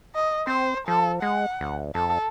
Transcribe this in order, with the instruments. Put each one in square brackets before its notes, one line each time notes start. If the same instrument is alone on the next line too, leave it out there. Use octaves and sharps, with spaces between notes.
[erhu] D#5
[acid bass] C4 [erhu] C5
[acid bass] F3 [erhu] A4
[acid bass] G#3 [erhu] F#5
[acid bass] D2
[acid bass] F2 [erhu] A4